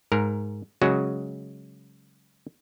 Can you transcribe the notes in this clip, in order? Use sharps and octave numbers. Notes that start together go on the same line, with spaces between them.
G#2 A#4
C#3 F#3 G#3 F#4